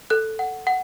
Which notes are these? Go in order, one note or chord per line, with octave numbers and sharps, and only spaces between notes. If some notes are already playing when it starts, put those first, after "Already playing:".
A4 F#6
F#5
F#5